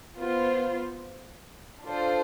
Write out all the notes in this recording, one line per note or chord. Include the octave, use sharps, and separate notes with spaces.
B3 F4 C5
D4 F4 A4 C5